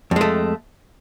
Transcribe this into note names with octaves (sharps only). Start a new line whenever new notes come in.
F2 G#3 A3